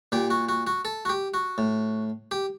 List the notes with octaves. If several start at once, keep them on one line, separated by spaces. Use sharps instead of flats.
A#2 G4
F#4
F#4
F#4
A4
F#4
G4
F#4
A2
G4